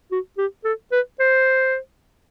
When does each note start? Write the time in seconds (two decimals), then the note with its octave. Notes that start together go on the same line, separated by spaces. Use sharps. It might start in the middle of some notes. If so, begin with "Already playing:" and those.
0.11 F#4
0.38 G4
0.64 A4
0.92 B4
1.19 C5